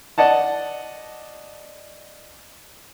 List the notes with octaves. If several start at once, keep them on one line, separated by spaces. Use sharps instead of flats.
D5 D#5 F#5 A5